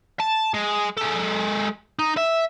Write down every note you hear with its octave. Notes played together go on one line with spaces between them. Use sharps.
A5
G#3
G#3 A4
D#4
E5